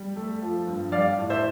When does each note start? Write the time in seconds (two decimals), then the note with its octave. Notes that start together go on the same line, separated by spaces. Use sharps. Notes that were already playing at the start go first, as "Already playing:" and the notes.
Already playing: G3
0.16 A3
0.42 F3
0.67 G2
0.92 G3 D5 F5
1.17 A2
1.30 C5 E5